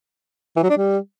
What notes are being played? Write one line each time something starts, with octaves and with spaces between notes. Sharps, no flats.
E3
F#3
D4
G3